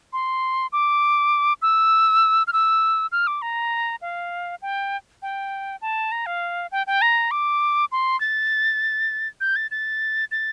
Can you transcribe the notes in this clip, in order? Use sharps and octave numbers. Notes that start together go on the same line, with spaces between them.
C6
D6
E6
F6
E6
F6
D6
A#5
F5
G5
G5
A5
A#5
F5
G5
G5
A#5
D6
C6
A6
G6
A6
A6
A6